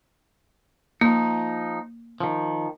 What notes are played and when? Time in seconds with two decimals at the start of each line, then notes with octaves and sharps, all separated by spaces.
1.01 F3 A#3 D#4
2.20 D#3 F3